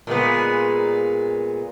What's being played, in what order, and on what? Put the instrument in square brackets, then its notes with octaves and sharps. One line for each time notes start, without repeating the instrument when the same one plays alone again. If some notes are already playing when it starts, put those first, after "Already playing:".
[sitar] A#2 G#3 B3